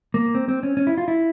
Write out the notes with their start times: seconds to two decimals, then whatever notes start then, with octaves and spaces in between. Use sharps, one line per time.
0.14 A#3
0.35 C4
0.49 C4
0.63 C#4
0.77 C#4
0.87 E4
0.98 F4
1.08 E4